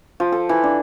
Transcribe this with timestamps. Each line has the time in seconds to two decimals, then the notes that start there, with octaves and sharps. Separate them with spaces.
0.20 F3
0.32 A4
0.49 E3
0.64 D4